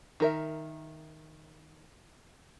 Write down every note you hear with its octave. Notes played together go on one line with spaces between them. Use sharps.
D#3 A#4 E5